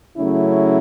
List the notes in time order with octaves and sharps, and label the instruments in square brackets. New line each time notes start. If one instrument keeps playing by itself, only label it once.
[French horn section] C#3 F#3 A3 C#4 E4